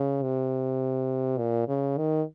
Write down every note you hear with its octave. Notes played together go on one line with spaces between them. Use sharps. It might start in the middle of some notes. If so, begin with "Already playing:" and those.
Already playing: C#3
C3
A#2
C#3
D#3